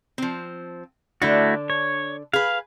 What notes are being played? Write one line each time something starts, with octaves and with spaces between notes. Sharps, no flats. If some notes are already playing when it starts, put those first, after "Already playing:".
F3 C4
D3 A3 D4 E4 F#4
C#5
G#4 B4 F5